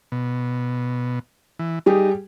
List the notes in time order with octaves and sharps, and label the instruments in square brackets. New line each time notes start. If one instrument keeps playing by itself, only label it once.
[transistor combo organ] B2
E3
[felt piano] G3 G4 G#4 [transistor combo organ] D#4